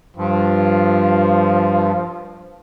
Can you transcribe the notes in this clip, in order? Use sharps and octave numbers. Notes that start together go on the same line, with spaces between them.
G2 F3